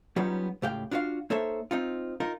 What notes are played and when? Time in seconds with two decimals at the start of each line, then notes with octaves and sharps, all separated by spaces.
0.16 F#3 G3 B3 C#4 D#4 F4
0.62 C#2 A2 G4 F5 G5
0.91 D4 F4 F#4 C#5 F5
1.30 A#3 D#4 A4 C5 C#5 E5
1.71 C4 D#4 F4
2.20 D#4 F4 A#4